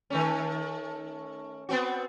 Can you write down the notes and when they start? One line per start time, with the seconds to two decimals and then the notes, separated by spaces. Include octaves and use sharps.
0.10 D#3 A3 C#4
1.69 B3 C4 F#4